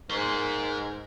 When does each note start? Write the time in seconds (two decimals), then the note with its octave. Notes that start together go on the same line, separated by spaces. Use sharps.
0.10 G#2 A#4 C6